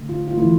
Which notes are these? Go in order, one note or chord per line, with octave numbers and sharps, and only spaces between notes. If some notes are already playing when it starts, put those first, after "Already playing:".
Already playing: D3 A3
F4
F4
E3 A3 E4